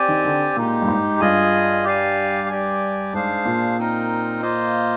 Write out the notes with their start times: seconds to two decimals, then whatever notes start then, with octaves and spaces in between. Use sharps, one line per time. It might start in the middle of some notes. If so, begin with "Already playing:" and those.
Already playing: C4 G4 D5 G#5
0.08 D#3
0.25 D3
0.56 A#2 G#3 D#4 G4
0.82 G2
0.88 G#2
1.20 G2 F4 G#4 D#5 G#5
1.84 G4 D5 F5 G#5
2.48 G4 D5 G#5
3.13 G#2 D4 G#4 C5 F5
3.45 A#2
3.78 C4 D#4 A#4
4.41 A#3 F4 C5 D#5